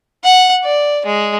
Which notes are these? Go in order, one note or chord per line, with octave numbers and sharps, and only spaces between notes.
F#5
D5
G#3